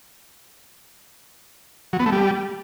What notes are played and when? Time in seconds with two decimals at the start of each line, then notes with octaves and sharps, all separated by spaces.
1.93 F#3
2.00 B3
2.06 A3
2.12 G3